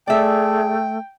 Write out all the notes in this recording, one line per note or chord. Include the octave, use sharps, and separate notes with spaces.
A3 G#4 D5 E5 G5 A5